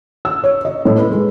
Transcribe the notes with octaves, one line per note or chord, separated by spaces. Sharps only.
E6
C#5
D#5
A2
B4
G#3